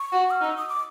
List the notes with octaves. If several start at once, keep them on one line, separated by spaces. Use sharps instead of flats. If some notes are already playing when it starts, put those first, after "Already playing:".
Already playing: C#6
F#4
F6
D#4 E6
D#6
D6